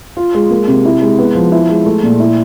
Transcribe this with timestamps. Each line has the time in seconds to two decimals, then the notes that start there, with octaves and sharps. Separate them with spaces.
0.17 F4
0.34 G#3
0.51 A#3
0.68 C3
0.85 E4
1.02 G#3
1.19 B3
1.35 F3
1.52 E4
1.69 G#3
1.86 A3
2.03 A#2
2.20 E4